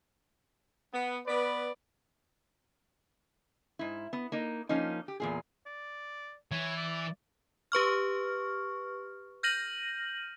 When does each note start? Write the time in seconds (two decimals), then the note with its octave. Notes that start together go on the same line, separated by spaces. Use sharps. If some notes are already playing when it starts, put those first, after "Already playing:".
0.93 B3
1.27 B3 B4 D5
3.79 G#2 E4
4.13 B3
4.32 A#3 D#4
4.69 F3 A#3 C#4 D#4
5.08 G4
5.20 E2 A#2 G#4
5.66 D5
6.52 E3 C#5
6.77 D5
7.72 G4 B4 C#6 F6
9.43 F6 G6 A#6 D#7 F#7